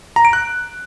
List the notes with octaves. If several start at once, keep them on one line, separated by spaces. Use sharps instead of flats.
A#5
D7
F#6